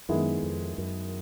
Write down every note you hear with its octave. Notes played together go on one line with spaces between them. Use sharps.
F#2 D#3 G#3 B3 E4
F2
F#2